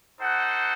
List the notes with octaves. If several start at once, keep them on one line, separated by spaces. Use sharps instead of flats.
D#4 A4 C5 F#5